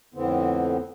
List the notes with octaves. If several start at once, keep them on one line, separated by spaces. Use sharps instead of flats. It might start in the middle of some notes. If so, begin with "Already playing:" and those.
F2 A2 D3 B3 C4